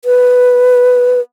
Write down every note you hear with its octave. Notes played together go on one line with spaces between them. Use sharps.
B4